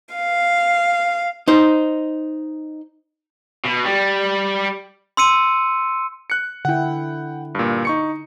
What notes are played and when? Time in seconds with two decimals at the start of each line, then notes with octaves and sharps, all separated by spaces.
0.14 F5
1.48 D#4 C5
3.65 B2
3.85 G3
5.17 C6 E6 C#7 D#7
6.30 F#6 C#7
6.65 D3 E4 F#5 G5
7.55 G2 A#2
7.85 D#4 C#6 C#7